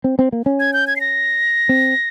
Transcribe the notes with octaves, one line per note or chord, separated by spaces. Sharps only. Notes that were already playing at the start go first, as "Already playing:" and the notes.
C4
C4
A#3
C#4
G#6
G6
G#6
C7
A#6
C4